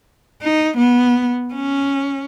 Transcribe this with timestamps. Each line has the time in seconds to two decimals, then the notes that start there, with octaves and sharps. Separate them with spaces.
0.42 D#4
0.77 B3
1.54 C#4